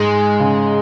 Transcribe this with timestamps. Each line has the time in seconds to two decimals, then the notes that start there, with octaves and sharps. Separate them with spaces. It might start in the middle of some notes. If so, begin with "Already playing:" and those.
Already playing: G#2 G#3
0.40 C#3